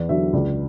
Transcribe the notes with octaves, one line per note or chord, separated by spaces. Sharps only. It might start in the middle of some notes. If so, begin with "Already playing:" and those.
Already playing: E2 D5
D3 F#3 E5
C#2 D5